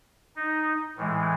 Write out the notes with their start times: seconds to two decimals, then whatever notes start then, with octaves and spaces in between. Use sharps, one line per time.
0.36 D#4
0.96 A2 E3 G#3